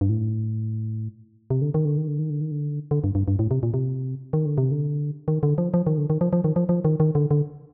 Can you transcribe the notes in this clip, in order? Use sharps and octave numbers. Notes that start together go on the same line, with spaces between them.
G2
A2
C3
D3
D#3
D3
D#3
D3
D#3
D3
D#3
D3
D3
G2
G2
G2
A2
C3
A#2
C3
D#3
D3
C3
D3
D#3
D3
F3
F3
D#3
D3
D#3
F3
F3
D#3
F3
F3
D#3
D#3
D3
D3